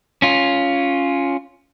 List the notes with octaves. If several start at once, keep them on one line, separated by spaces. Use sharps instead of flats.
C#4 F4